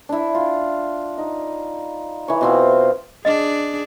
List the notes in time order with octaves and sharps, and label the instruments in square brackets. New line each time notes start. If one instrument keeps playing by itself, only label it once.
[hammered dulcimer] D4 E4
F4
D#4
E3 C#5
B2 C4 F4
[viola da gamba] D4 G#4 [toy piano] D#5